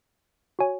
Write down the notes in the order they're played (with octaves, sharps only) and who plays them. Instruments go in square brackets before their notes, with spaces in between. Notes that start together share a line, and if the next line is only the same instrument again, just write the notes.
[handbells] F#4 C#5 G#5